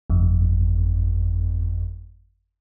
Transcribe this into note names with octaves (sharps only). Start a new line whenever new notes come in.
G1 F2